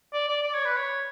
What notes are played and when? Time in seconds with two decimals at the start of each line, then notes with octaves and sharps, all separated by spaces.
0.13 D5
0.28 D5
0.43 D5
0.54 C#5
0.65 B4
0.77 C#5